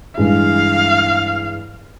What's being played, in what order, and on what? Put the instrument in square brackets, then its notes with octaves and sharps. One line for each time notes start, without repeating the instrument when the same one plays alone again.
[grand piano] G2 E3 G#3 [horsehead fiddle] F5